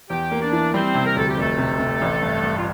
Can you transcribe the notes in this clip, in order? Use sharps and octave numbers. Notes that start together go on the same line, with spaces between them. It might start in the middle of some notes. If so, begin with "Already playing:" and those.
E2 G4 G5
A#3
D4 D5
E3
G3 C4 C5
C3
A#4
D2 A4
G4
F1 A3 A4
C3
C3
A1
G2
G2
F4